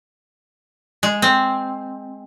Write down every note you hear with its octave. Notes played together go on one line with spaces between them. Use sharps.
G#3
C4